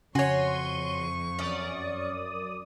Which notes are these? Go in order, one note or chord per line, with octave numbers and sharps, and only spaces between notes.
F2 C#3 F#4 C#5 G#5 C6 C#6 D#7
F#2 C#4 D5 D#6